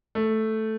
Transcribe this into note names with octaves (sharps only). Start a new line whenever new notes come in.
A3